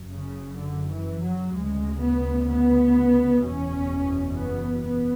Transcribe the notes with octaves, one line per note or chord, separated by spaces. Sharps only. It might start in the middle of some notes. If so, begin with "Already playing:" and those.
Already playing: F#1 F#2
C#3
D3
E3
F#3
D2 C#3 G#3
B3
B3
F#1 E2 B2 C#4
B3
B3